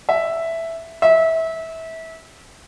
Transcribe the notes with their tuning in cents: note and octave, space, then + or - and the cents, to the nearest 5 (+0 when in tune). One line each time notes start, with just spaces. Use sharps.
E5 +0
E5 -25